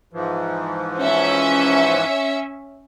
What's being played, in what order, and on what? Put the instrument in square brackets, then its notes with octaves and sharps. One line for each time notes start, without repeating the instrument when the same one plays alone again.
[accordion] G#2 E3 F3
[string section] C#4 E5